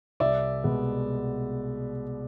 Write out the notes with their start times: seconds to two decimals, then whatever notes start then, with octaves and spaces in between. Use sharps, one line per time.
0.20 C2 D5 E5
0.64 B2 G#3 B3